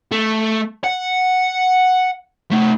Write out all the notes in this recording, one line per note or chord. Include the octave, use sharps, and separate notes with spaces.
A3
F#5
A3 D#4